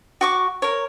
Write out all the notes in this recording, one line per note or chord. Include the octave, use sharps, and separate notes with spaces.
F#4 C#6 D6
A#4 C#5